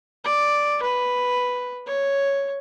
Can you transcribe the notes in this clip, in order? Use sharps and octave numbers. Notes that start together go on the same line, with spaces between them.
D5
B4
C#5